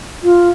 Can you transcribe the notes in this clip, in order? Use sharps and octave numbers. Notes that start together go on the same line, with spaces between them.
F4